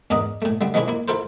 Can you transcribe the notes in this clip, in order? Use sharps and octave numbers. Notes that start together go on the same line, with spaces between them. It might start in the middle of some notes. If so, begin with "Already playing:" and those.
E2 G#2 D4 A#4 D#5
A2 A3
D3 G3 E5
D#3 F3 G#3 C#4 D4 E4
A#3 E4
E4 F4 A4 A#4 C5